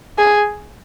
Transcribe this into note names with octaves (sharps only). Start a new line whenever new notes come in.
G#4